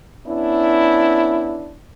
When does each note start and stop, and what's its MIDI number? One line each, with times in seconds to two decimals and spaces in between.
0.26 1.74 59
0.26 1.74 61
0.26 1.74 62
0.26 1.74 64